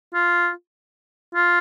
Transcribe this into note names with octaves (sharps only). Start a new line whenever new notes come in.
F4
F4